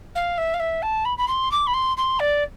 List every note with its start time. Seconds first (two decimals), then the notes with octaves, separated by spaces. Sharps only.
0.15 F5
0.37 E5
0.54 F5
0.59 E5
0.82 A5
1.05 B5
1.17 B5
1.27 C6
1.51 D6
1.66 B5
1.73 C6
1.97 C6
2.19 D5